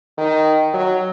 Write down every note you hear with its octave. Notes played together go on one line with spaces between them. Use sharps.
D#3
F#3